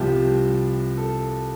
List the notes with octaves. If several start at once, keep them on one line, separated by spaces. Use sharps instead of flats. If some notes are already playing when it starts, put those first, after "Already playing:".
Already playing: C2 C3 F3 G4
A4